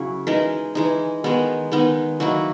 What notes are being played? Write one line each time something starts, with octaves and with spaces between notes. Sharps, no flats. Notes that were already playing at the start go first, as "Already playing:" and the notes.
Already playing: C#3 F#3 C#4 E4
E3 G#3 D#4 A#4
E3 G#3 D#4
D#3 G#3 B3 D#4
D#3 G#3 B3 D#4
D#3 F#3 A#3 E4 F#4